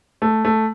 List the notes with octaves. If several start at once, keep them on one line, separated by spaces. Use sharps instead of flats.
A3
A3